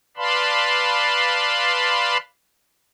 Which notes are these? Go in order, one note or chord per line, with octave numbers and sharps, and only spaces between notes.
B4 D5 F5 A5 B5 C6